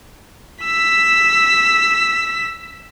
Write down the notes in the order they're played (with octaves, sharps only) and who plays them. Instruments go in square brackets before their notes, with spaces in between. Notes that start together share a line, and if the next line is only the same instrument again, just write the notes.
[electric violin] E6 B6